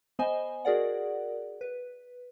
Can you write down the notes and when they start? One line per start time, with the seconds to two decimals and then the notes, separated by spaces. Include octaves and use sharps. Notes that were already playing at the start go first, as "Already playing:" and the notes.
0.19 B3 C5 D#5 G#5
0.65 F#4 G#4 A#4 D5 F#5
1.61 B4